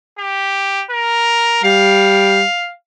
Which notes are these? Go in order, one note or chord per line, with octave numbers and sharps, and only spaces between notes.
G4
A#4
G3 F5